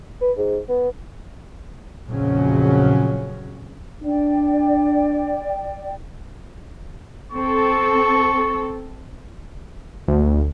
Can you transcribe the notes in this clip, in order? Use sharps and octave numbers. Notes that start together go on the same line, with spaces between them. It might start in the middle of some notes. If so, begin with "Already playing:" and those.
B4
G#2
B3
A#1 F2 A#2 C#3 F#3 C#4
D4 D5 G5
C4 A4 C#6
D2